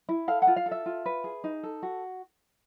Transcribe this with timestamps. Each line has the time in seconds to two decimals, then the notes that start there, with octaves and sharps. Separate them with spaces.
0.09 E4
0.28 A4 F5
0.42 F#5
0.47 F4
0.56 F5
0.66 A4
0.71 E5
0.86 F4
1.06 B4
1.24 G#4
1.44 D#4
1.63 A4
1.83 F#4